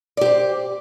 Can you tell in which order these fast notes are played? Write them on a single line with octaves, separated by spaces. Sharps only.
D5 G4 C5